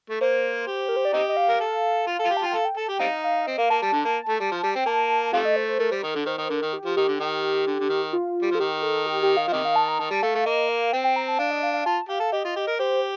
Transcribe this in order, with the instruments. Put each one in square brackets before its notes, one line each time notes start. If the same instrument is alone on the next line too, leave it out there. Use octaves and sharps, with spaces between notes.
[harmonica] A3
[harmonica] A#3 [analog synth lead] C5
[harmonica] G4
[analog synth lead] A#4
C5
D5
[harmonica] C4 D#4 G4 [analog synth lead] D#5
[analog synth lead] D#5
F5
[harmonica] A#4
A4
F4
A4
F4
G4
[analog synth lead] A5
[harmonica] F4 [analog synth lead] G5
[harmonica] A4 [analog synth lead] F5
[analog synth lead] G5
[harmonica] A4 [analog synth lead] A5
[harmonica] G4 [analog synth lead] G5
[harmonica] G3 C4 D#4 [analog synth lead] F5
[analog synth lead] F5
[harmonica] C4 [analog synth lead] D#5
[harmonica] A#3 [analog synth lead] F5
[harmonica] A#3 [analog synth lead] A5
[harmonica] G3 [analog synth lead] A5
[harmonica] D3
A#3
A3
G3
F3
G3
[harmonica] C4 [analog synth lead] G5
[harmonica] A#3 [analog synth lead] A5
[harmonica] C3 F3 A3 [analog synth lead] F5
[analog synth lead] D#5
C5
C5
[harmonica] A3 [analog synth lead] A#4
[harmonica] G3 [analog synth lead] C5
[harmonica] D#3 [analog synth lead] A#4
[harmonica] D3 [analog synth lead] A4
[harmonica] D#3 [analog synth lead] C5
[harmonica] D#3
[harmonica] D3 [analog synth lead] A#4
[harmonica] D#3
[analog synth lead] G4
[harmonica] F3
[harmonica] D#3 [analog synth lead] G4
[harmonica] D3
D#3
D3
D3
D#3
[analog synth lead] F4
[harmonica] G3
[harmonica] F3 [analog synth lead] A4
[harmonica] D#3 [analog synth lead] G4
[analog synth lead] A4
G4
G4
F5
[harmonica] F3
[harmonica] C3 D#3 [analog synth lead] D#5
[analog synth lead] F5
A5
A#5
[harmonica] D#3 [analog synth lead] A5
[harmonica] G3
[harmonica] A3 [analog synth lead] F5
[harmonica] A3
[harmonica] A#3 [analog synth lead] D#5
[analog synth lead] F5
[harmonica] C4 [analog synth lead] G5
[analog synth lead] G5
A#5
A5
[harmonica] D4 [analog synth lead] F5
[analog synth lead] D#5
F5
F5
[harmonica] F4 [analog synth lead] A5
[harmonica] G4 [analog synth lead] F5
[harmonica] A4
[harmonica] G4 [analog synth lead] D#5
[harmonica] F4
G4
A#4
[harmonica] G4 [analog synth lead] C5